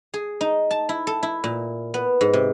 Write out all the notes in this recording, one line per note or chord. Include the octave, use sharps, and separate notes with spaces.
G#4
D#4
A5
E4
A4
E4
A#2
B3
G#2
C3